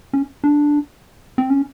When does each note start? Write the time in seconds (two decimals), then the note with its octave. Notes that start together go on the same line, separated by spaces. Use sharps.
0.13 C#4
0.44 D4
1.38 C4
1.50 C#4